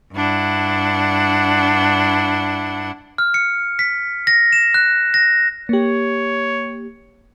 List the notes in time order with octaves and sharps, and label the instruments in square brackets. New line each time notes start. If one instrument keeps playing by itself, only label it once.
[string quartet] G2 D4 E4 F#5
[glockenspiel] F6
C#7
B6
A#6
E7
F#6
A#6
[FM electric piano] A#3 G4 [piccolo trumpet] C#5